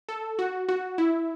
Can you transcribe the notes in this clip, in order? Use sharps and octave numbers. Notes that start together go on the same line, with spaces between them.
A4
F#4
F#4
E4